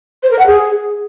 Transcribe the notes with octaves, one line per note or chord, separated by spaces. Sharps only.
C5
A#4
F#5
G#4